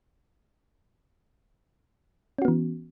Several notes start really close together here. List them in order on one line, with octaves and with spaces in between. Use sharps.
C#4 F#4 B3 E3